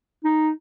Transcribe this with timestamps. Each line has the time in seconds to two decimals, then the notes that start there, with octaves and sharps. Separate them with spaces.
0.25 D#4